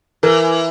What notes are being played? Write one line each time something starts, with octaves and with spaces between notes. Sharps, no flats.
E3 A#4